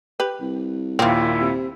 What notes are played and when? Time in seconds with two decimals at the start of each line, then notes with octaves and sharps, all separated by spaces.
0.20 G4 B4
0.41 C2
0.99 D#2 A#2 C4 E4 F4
1.41 C3